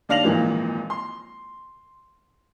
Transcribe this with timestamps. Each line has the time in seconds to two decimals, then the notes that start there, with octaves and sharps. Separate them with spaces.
0.09 D#2 D4 F5 A#6 F7 F#7
0.23 G#1 A#2 E3 F3 G#3
0.90 C6